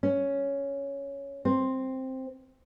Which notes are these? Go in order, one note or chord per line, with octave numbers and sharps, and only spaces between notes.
C#4
C4